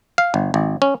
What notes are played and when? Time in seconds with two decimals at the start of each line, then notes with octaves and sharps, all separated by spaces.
0.18 F5
0.34 G1
0.54 G#1
0.82 C#4